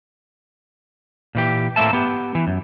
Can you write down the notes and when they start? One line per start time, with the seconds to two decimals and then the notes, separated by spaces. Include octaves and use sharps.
1.35 A#2 E3 G4
1.76 A2 A#3 C4 E5 A5
1.93 B3 G4
2.35 E3
2.47 F#2